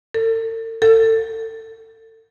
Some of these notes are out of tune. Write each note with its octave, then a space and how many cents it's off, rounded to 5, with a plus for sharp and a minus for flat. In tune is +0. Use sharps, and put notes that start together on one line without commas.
A4 +45
A4 +30